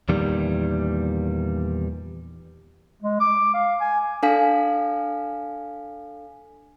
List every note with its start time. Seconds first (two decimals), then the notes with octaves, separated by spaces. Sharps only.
0.09 E2 A#2 D#3 G3
3.02 G#3
3.20 D6
3.54 F5
3.81 G#5
4.23 D4 A4 F5 G#5 B6